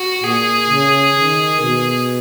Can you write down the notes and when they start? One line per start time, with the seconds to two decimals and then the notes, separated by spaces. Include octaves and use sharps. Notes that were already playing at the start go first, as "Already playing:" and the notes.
Already playing: F#4
0.24 A#2 G#4
0.70 C#3
1.16 D#3
1.61 B2